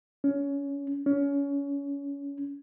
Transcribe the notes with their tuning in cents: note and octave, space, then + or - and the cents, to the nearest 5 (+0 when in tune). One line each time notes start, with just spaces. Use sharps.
C#4 +20
C#4 +25